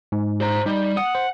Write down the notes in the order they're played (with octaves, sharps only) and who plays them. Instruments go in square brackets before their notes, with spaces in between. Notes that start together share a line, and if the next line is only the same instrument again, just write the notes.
[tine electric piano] G#2
[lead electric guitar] C5 A#5
[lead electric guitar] G3 [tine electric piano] D#4
[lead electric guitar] F#5 [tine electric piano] D#6
[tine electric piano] C5